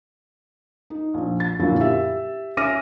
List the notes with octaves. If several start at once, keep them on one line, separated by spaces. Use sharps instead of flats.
D#4
A#1
A6
F#2 A#2 D3 F#3 A#3 E4
G4 E5
C#4 E5 D6 F6 A#6 D#7